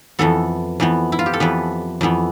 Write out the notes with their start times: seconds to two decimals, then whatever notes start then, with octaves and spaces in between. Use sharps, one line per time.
0.19 F2 E3 B3 A4
0.80 F2 E3 B3
1.12 E4
1.19 F4
1.26 G4
1.33 A4
1.40 F2 E3 B3 B4
2.01 F2 E3 B3